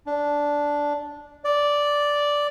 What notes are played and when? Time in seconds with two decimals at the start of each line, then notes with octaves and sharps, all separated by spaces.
0.06 D4
1.44 D5